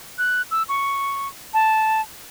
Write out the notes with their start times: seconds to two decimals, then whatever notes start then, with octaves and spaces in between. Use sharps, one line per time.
0.18 F#6
0.51 E6
0.69 C#6
1.54 A5